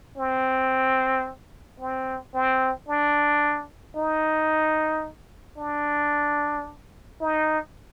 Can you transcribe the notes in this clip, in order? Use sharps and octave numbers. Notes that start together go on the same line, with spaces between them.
C4
C4
C4
D4
D#4
D4
D#4